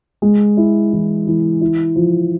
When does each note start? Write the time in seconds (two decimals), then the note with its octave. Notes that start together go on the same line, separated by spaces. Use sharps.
0.22 G#3
0.57 E4
0.92 E3
1.27 E3
1.61 E4
1.96 F3